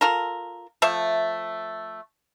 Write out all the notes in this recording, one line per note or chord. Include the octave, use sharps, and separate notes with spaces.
F4 A4 A#4
F3 A3 E5